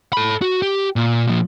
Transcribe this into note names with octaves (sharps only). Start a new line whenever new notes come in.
A4 B5
F#4
G4
A#2
A#2 F3